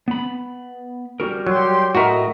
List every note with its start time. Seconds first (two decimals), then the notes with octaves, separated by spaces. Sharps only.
0.08 B3 B5
1.20 G3 F#4 A#4
1.47 F#3 G4 C6
1.95 A2 F#4 A#4 D#5 E5